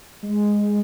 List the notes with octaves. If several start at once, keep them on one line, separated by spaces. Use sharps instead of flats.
G#3